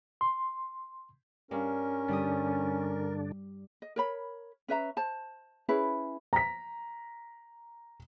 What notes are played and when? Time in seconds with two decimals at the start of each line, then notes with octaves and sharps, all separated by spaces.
0.21 C6
1.51 G2 C#4 A#4
2.08 G2 D3 G3 D4 G4 D#6
3.82 D#5
3.96 A#4 C#5 B5
4.68 C#4 B4 E5 A#5
4.97 C5 A5
5.69 C#4 E4 G#4 B4
6.33 A#5 B6